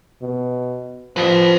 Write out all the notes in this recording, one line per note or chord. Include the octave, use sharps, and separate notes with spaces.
B2
F3 B4 A5